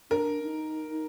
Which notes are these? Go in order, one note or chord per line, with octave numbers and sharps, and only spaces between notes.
D4 A#4
D#4